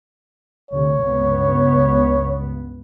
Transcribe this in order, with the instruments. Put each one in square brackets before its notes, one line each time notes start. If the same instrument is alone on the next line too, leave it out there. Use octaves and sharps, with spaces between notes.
[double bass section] D2 C3 [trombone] C#5
[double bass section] C#2 G2 B3